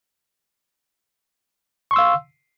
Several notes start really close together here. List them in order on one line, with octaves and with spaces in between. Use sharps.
C#6 C6 E6 F5